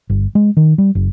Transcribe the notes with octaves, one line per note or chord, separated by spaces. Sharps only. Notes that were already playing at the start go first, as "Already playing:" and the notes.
G1
G#3
D#3
G3
F#1